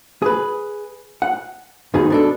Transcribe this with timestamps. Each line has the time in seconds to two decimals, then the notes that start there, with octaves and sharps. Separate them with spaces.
0.22 G#4 B4
1.22 F#5
1.94 D#2 B2 D#4 G#4
2.10 B2 D4 A4